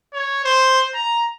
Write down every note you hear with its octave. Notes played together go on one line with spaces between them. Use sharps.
C#5
C5
A#5